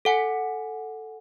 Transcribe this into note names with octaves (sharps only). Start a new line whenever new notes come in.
A4 F#5 G#5